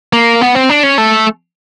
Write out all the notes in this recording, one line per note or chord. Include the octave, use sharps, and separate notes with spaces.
A#3
B3
C4
D4
C#4
A3